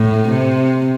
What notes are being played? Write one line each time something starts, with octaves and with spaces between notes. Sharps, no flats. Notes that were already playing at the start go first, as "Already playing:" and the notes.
Already playing: A2
C3